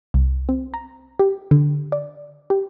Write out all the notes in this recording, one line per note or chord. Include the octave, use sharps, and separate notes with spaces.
C2
C4
A#5
G4
D3
D5
G4